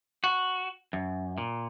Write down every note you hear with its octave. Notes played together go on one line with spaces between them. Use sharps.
F#4
F#2
A#2